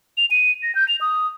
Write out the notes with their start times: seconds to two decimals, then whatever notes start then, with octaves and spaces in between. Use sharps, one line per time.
0.17 F7
0.31 D#7
0.63 A#6
0.75 G6
0.88 F7
1.01 D#6